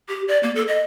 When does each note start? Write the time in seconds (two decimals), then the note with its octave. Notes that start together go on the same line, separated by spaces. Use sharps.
0.09 G4
0.28 D5
0.43 A#3
0.55 A4
0.68 D#5